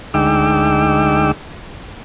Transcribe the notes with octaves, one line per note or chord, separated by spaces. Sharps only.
D2 G#3 D#4 G5 D6 E6